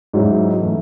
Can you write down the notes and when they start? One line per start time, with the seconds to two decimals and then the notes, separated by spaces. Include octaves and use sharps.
0.13 G#2 F#3 C#4 E4
0.59 E3 A3